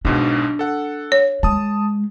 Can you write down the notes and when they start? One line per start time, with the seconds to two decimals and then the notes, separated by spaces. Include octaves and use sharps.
0.05 B1 G#2 B2 D4
0.59 A4 F#5
1.12 C#5
1.43 G#3 A5 D#6